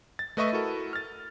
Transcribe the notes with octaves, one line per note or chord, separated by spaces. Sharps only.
A6
A3 B4 D#5 E5 C#6 D#7
E4 F#4 A4 A#4
F6 A6